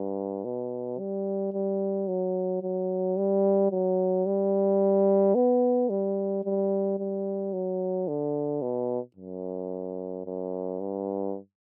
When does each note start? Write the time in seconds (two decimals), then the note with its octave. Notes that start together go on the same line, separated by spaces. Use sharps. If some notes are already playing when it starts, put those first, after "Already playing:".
Already playing: G2
0.44 B2
0.99 G3
1.53 G3
2.08 F#3
2.62 F#3
3.17 G3
3.71 F#3
4.26 G3
5.35 B3
5.90 G3
6.44 G3
6.98 G3
7.53 F#3
8.08 D3
8.62 B2
9.16 F#2
10.25 F#2
10.80 G2